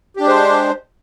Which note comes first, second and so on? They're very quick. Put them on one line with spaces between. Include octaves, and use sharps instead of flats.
G4 D4 G#3 C5